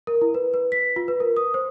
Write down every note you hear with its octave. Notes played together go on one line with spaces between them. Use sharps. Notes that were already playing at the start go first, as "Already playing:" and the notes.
A#4
E4
B4
B4
B6
F4
B4
A#4
D#6
C5